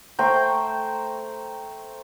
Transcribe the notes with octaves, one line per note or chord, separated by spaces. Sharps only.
A3 C5 G5 A#5